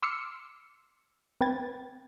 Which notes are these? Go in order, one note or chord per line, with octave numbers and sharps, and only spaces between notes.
C6 D6 E6 F6 C7 C#7
C4 B4 G5 G#6 A6